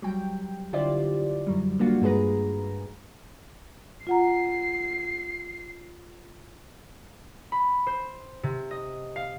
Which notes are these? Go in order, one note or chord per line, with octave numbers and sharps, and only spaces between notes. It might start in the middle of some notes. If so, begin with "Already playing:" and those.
F#3 G3 G5
D3 E4 F4 G4 C5 D5
F#2 F#3 G3
G3 A#3 D4 F4 F#4
G2 G#3 G#4 B4 A#5
F4 F#5 A#5 C7
B5
C5
C3
D#5
F5